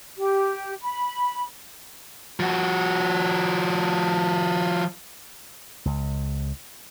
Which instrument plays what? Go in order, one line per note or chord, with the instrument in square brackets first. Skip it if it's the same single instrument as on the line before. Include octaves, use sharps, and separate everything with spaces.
[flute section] G4
B5
[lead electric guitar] F3 F#4
[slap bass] C#2